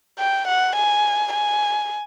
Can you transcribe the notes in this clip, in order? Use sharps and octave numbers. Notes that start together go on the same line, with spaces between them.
G5
F#5
G#5
G#5